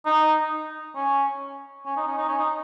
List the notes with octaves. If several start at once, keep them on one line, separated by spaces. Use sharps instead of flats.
D#4
C#4
C#4
D#4
C#4
D#4
C#4
D#4